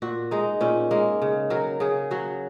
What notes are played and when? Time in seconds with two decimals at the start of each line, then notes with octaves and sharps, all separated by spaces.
0.02 A#2 F#4
0.31 G#3 D#4
0.61 A#2 C#4
0.91 G#3 A#3
1.22 C#3
1.50 F#3 A#4
1.80 C#3 G#4
2.11 F#3 F#4